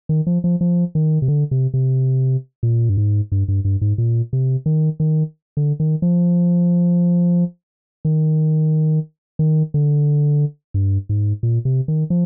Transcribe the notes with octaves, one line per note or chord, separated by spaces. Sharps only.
D#3
F3
F3
F3
D#3
C3
D3
C3
C3
A#2
G2
G#2
G2
G2
G2
G#2
A#2
C3
D#3
D#3
D3
D#3
F3
D#3
D#3
D3
G2
G#2
A#2
C3
D#3
F3